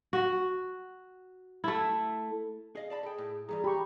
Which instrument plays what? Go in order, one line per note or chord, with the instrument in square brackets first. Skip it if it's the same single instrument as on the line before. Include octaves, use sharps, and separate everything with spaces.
[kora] F#4
A3 E4
[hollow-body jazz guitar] G#4 D#5 F5
D5 A5 B5
[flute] G#4 [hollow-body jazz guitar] A4 G5
[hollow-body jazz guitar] A2
[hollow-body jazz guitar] G2 E3 G3 [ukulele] G#4 [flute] A#5
[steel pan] G4 C#6 [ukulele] B5